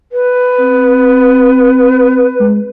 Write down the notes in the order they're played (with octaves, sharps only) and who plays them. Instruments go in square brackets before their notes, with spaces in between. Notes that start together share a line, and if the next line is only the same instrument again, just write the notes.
[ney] B4
[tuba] C4
G#3